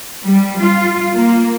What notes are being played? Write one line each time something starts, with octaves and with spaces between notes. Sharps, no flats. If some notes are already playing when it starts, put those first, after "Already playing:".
G3
F4
A#3